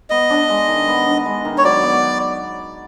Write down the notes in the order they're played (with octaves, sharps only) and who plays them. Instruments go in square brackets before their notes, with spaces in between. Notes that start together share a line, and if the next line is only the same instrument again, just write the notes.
[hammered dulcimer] B3 [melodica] D#5
[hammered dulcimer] D4
G#3
D#3
B3
D4
G#3
D#3
[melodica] C#5
[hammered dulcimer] F#3 [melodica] D5
[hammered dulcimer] B3